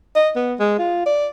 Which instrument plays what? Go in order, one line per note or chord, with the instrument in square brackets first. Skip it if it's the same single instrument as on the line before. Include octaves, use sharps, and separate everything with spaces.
[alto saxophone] D#5
B3
G#3
F4
D5